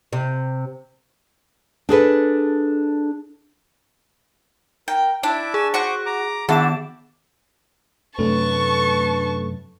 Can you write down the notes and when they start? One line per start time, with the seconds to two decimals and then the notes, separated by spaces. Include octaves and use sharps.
0.13 C3
1.89 D4 G#4 A4 B4
4.88 A#4 G5
5.23 D4 E4 E5 D6
5.54 G#4 G#5 E6
5.74 F#4 C5 C#6 D6
6.06 A#5 D6
6.49 D#3 B3 D4 E4 F#4 G4 E7
8.19 F#2 C3 A3 D4 A4 B4 A5 C#6